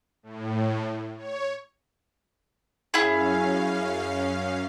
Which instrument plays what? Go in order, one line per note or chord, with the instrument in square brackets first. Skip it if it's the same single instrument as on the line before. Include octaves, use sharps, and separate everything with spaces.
[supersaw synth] A2
C#5
[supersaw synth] F#2 C#4 F5 [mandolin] E4 G#4